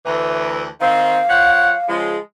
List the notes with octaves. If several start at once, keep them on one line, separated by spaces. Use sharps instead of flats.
D2 E3
D#3 C4 F5
F3 C#5 F#5
C#3 F3 G#3